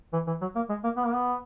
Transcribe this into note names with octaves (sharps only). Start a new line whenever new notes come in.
E3
E3
F#3
A#3
G#3
A#3
B3
A#3
B3